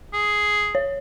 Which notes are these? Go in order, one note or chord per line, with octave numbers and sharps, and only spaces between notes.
G#4
C#5